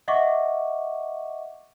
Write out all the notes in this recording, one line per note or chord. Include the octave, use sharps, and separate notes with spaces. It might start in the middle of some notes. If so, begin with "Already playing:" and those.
D#5 E5 F#5 C#6 D6